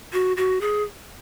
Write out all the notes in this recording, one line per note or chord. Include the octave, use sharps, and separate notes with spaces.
F#4
F#4
G#4